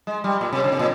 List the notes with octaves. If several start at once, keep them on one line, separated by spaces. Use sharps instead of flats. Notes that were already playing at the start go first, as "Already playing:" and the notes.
G#3
G3
A#2
C3
C#3
C3
A#2